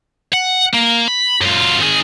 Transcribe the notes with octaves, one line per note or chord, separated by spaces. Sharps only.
F#5
A#3
B5
F#2 F4
D#3 G#4